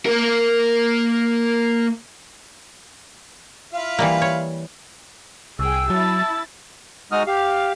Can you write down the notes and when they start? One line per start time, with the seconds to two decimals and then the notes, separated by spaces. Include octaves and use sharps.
0.06 A#3 A#4
3.73 E4 F4 F5
3.99 E3 G3 A#3
4.22 C#5
5.59 C2 G#4 G5 E6
5.90 F#3 E4 A5 A6
7.12 G#3 D#4 F#4 D#6 F6
7.27 G4 F5